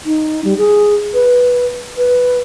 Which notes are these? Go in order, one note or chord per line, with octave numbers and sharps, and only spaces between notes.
D#4
G3
G#4
B4
B4